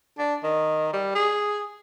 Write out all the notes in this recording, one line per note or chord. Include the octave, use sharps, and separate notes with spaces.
D4
D#3
G3
G#4